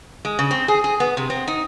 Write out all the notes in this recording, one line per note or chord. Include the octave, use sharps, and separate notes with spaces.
G#3
C#3
C4
G#4
G#4
B3
C3
C4
D#4